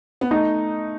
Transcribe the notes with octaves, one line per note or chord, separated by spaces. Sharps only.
B3
A3 D#4